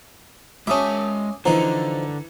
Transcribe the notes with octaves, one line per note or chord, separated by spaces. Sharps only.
G#3 C#4 F#4 E5 A5 D6 D#6
D3 E3 F3 D#4 E4 A#5